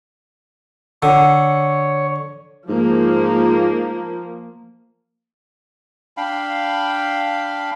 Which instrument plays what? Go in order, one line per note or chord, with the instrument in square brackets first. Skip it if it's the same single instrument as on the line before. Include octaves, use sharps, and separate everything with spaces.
[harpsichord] D3 [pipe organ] C#5 [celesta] F#5 E6
[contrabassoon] G#2 [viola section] F3 A#3
[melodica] D4 F5 G5 B5